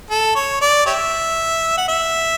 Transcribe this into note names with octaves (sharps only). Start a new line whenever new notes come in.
A4
C#5
D5
G4 C#5 E5
F#5
E5